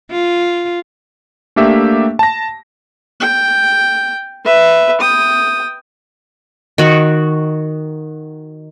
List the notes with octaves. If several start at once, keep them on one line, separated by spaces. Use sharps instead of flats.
F4
A3 A#3 D4 G4 E5
A5 A#6
G5
B4 E5
G5 D#6
D#3 F#4